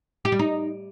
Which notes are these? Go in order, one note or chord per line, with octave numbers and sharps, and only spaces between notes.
G4
G3
D#4